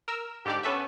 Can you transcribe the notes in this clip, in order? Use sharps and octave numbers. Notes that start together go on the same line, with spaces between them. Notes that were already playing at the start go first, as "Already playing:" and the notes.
A#4 E6
G#2 D3 G4 D5
B3 C#4 A4 B4 E5